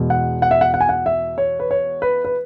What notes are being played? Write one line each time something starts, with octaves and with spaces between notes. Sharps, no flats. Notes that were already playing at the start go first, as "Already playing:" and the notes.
Already playing: E2 B2 G#3
F#5
F#5
E5
F#5
F#5
G#5
F#5
E5
C#5
B4
C#5
B4
B4